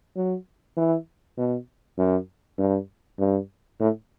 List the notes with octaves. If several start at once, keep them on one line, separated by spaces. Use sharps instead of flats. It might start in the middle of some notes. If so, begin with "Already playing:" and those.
F#3
E3
B2
F#2
G2
G2
A2